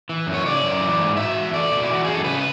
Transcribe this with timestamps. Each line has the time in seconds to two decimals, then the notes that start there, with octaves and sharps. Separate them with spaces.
0.09 E3
0.27 F#2
0.34 C#5
0.45 C#3 D5
0.64 F#2
0.81 E3
1.00 G#2
1.17 B2 E5
1.35 E2
1.53 A3 D5
1.71 B2
1.83 E4
1.88 E3
1.94 F#4
2.05 F#2 G#4
2.14 A4
2.24 C#3 B4